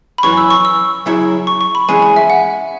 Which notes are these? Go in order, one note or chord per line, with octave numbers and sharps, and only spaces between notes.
B5
F#2 E3 C#4 C#6
E6
C#6
E6
C#3 F#3 E4 C#5 E5
C#6
C#6
B5
E3 G#3 C#4 G#5
G#5
E5
F#5